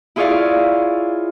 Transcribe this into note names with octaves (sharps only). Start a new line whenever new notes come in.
E4 F4 G#4 C#5 D5 F5